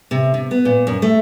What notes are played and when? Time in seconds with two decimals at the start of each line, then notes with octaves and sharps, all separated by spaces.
0.11 C3
0.34 C3
0.51 B3
0.65 A#2
0.87 F#2
1.02 A3